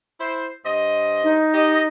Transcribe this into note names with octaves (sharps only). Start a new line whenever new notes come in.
E4 C5
G2 C5 D#5
D#4
G4 D#5